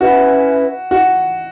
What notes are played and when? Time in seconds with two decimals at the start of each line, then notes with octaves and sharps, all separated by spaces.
0.01 C#4 E4 F#4 B4 E5
0.91 F#4